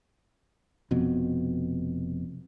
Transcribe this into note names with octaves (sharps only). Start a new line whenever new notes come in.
F1 F2 B2